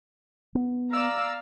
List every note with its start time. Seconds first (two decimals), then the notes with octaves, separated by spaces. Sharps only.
0.55 B3
0.93 D5 F5 A#5 E6